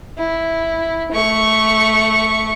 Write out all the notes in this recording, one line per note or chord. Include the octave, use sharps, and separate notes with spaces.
E4
A3 C#6